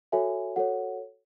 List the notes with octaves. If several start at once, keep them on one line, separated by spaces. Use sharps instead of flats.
F#4 A4 C#5 E5 G#5
F#4 A4 C#5 F#5